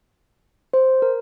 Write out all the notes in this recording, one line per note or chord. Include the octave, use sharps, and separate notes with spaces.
C5
A#4